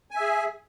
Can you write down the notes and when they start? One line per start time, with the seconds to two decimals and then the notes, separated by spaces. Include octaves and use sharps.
0.11 G#5
0.15 E5
0.20 G#4